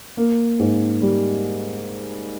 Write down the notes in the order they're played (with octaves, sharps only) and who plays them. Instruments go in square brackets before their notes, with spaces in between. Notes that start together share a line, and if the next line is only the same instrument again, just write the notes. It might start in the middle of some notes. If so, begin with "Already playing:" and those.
[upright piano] A#3
G#2
G3